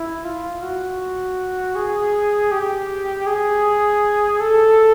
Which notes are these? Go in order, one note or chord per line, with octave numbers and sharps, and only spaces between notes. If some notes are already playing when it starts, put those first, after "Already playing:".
Already playing: E4
F4
F#4
G#4
G4
G#4
A4